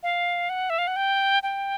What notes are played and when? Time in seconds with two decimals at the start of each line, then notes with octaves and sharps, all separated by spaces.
0.03 F5
0.49 F#5
0.70 E5
0.78 F5
0.87 F#5
0.96 G5
1.43 G5